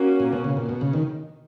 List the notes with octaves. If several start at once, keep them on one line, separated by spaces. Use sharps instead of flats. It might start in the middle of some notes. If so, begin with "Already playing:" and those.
Already playing: A#3 C#4 F#4
A#2
B2
C#3
A#2
B2
C#3
D#3